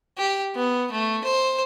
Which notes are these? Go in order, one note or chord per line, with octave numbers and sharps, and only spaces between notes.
G4
B3
A3
C5